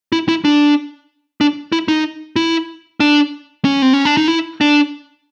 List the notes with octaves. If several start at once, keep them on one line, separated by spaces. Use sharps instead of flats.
E4
E4
D4
D4
E4
D#4
E4
D4
C#4
C4
C#4
D4
D#4
E4
D4